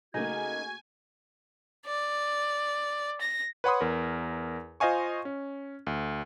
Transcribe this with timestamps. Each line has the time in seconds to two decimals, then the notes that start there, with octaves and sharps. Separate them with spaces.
0.14 C#3 A3 A#3 D#4 F#4 G#5 G#6
1.85 D5
3.20 A#6
3.64 B4 C#5 F#5 B5 C6 D#6
3.81 E2 A#4
4.80 F4 C5 D#5 F5 G#5 C#6
5.25 C#4
5.87 D2